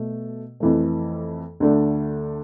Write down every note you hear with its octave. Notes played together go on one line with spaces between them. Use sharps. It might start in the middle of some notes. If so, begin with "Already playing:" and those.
Already playing: B2 A3
F2 E3 A3
D2 D3 A3 D4